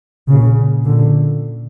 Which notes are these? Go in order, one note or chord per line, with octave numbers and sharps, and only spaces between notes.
A#2 C#3
A#2 D3